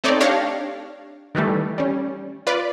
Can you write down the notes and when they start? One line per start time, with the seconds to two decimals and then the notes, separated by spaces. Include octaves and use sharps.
0.04 A3 C4 D#4 C#5 D5
0.20 D4 G4 C#5 F5 A#6 C#7
1.35 D#3 E3 G3 A3
1.78 G3 C#4
2.47 F4 B4 D5